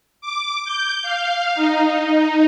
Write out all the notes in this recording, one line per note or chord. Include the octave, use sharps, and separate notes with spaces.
D6
G6
F5
D#4
D#4